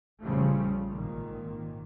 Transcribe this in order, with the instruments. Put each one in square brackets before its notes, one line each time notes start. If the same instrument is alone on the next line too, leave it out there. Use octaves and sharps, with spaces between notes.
[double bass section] A#1 C#3 F3 G3 A3
G#1 A#2 D#3